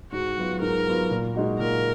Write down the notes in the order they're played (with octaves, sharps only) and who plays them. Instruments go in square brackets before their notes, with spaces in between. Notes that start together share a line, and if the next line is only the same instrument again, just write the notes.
[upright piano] G#2 [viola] F#4
[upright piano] F#3 B3 F4
[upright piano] G#2 [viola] A#4
[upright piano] F#3 B3 F4
A#2
G#3 D#4 F#4
[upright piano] A#2 [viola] A#4